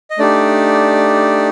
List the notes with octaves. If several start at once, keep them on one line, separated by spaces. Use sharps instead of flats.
D#5
A3 D4 D#4 G4 D5